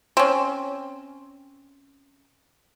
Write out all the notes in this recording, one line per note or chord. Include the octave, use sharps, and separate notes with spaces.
C4 C#4